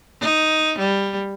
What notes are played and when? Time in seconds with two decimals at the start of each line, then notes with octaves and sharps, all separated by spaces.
0.21 D#4
0.79 G3